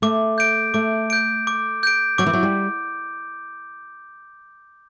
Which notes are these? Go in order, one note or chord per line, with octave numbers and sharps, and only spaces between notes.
A3 D6
G6 D7
A3 D6
G6 D7
D6
G6 D7
F#3 D6
E3
F#3
G3